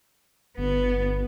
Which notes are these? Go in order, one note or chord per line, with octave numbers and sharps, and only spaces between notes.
G1 B3